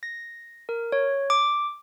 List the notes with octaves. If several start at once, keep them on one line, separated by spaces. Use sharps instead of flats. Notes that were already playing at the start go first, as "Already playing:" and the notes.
A#6
A#4
C#5
D6